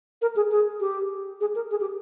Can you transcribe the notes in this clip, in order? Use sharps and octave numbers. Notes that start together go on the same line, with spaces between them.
A#4
G#4
G#4
G4
G#4
A#4
G#4
G4